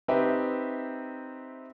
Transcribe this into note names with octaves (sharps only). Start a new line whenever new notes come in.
C4 D#4 G4 B4 E5